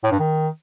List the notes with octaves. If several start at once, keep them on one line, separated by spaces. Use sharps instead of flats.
A2
G2
D#3